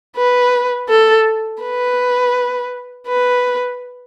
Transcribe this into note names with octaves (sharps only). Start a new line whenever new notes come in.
B4
A4
B4
B4